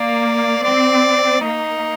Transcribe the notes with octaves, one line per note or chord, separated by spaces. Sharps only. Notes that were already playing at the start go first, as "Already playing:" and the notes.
Already playing: A#3 D5
C4 D5
A#3 D#4